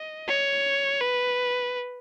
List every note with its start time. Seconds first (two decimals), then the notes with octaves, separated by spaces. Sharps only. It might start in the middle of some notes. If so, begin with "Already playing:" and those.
Already playing: D#5
0.28 C#5
1.00 B4